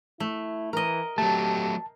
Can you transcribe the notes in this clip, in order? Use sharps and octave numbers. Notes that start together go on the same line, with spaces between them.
A3 E4
E3 A#4 D#5
F#3 A3 G4 A5